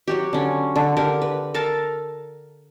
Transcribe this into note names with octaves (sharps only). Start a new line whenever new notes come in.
F#3 F#4 G4
D3 C#4
D3
D3 G4 A#4
B4
A4 A#4 F5 A5